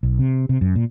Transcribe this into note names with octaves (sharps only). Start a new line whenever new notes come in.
B1
C3
C3
F#2
A#2